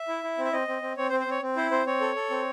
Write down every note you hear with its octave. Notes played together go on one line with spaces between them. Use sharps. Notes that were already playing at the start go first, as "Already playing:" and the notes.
Already playing: E5
E4
E4
C4
E5
C4 D#5
C4
C4
C4 C#5
C5
C4
C5
C4 C#5
C4
E4 C5
C4 C5
C4 C#5
A4
A4
C4